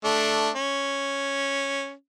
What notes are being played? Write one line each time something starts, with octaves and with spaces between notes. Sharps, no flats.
A3 D4
C#4